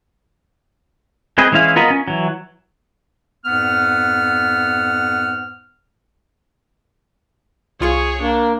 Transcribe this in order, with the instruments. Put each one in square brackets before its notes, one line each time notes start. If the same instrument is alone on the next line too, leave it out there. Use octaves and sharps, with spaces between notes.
[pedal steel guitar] G#3 C4 G#4 B4 D#5
E3 G#3 C#4 E4 F5
B3 F4 A#4 D#5 B5
C#4
E3 F#3
[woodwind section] F2 G#2 B3 F#5 F6
[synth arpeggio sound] C2 F4 C#6 [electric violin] G#4 C#5
[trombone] A#3 [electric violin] D4